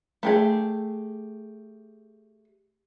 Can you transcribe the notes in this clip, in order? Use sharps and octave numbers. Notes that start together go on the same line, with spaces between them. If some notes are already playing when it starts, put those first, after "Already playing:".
A3 G4 G#4